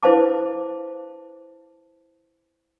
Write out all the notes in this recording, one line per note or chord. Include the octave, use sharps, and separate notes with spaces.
E4 B4 C5 F5 A5 D6